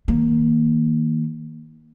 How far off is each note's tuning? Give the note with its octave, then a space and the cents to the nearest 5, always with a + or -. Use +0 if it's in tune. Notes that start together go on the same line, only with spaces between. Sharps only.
D#3 +30 A#3 +0